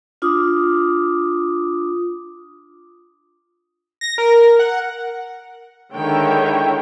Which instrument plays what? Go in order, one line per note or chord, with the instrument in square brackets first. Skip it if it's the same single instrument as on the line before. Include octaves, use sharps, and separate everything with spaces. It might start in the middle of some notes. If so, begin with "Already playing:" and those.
[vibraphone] D4 F4 D6 D#6
[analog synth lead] A#6
A#4
F#5
[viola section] D3 D#3 G#3 E4 C#5 G5